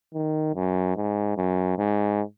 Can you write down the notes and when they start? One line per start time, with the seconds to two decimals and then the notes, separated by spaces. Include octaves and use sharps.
0.14 D#3
0.55 F#2
0.96 G#2
1.37 F#2
1.78 G#2